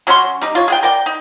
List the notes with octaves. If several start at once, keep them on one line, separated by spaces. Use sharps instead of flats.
F#3 C#4 F#4 C6
G3 D#4
F4 C#5
G#4 F#5 G5
A#4 D5 G5
D#4